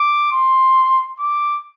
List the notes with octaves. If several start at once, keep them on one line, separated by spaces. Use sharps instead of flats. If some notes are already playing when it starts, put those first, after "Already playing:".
Already playing: D6
C6
D6